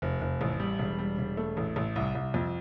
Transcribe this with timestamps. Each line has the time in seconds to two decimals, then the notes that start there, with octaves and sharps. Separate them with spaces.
0.02 F1
0.21 F1
0.41 A1
0.60 G3
0.79 E1
0.99 G3
1.18 E1
1.37 A3
1.57 A1
1.76 A1
1.96 C2
2.15 C2
2.34 F2